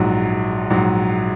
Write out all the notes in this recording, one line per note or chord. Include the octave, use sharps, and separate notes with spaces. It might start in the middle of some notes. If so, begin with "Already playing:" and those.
Already playing: A#1 G#2 F#3
A#1 G#2 F#3